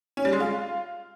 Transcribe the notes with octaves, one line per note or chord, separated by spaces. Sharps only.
C#4
G3
G#3
F4